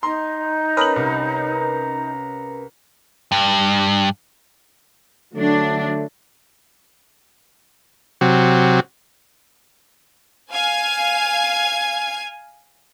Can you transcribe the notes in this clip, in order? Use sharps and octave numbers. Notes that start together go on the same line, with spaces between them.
D#4 A#5 C6
C#4 A#4 B4 D#6 F#7
C2
G2
D3 F#3 A3 D4
C3 F#3
F5 G#5 G#6